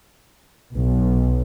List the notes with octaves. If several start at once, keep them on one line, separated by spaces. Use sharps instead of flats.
B1